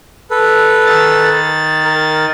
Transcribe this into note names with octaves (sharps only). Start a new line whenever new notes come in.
A4 B4
D#3 A6
A#4